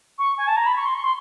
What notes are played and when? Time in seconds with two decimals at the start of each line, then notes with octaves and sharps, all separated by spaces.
0.18 C#6
0.38 G#5
0.47 A5
0.56 A#5
0.66 B5
0.76 C#6
0.85 C6
0.94 C#6
1.04 C6